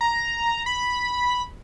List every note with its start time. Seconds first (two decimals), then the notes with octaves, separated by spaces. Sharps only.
0.01 A#5
0.66 B5